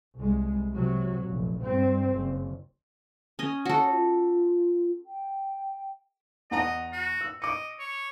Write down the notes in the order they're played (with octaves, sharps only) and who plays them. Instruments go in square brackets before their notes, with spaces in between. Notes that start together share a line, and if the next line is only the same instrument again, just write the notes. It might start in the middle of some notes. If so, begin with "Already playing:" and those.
[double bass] C2 G#3
C3 F#3
F1 A#1
G2 C4
F#1
[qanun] C#4 D#5
[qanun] F#4 A4 [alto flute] C#5
[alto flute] F4
G5
[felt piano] E2 F#5 A#5 [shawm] D#5
[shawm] F#4
[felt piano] E6
[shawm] D#5 [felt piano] D6 C#7
[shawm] C#5